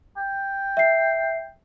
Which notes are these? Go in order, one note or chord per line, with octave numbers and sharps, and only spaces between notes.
G5
E5 C7